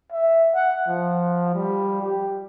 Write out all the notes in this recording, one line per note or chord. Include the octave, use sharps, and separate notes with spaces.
E5
F#5
F3
G3
G4